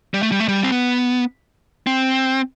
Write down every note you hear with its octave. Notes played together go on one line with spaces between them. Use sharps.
G3
A3
G3
A3
G3
C4
B3
C4